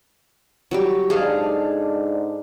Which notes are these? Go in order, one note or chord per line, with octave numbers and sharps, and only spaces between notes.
F#3 G3 G4
G#2 D4 G#4 A4 F5